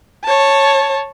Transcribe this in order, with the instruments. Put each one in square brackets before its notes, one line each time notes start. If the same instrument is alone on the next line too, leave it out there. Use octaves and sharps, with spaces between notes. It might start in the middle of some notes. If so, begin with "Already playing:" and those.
[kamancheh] C#5 A5